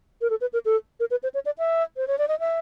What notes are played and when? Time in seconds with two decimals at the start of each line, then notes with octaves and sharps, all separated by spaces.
0.21 A#4
0.30 A4
0.41 B4
0.53 A#4
0.65 A4
1.00 A#4
1.11 B4
1.23 C5
1.34 C#5
1.46 D5
1.58 E5
1.97 C5
2.08 C#5
2.18 D5
2.28 D#5
2.40 E5